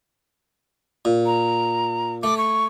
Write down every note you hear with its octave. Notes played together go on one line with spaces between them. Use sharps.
A#2
A#5
A3 D6
C#6